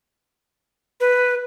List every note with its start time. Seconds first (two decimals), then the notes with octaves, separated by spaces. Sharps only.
1.00 B4